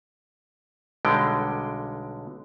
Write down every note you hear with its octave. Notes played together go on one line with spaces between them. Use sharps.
B1 D3 G3 G#3 G5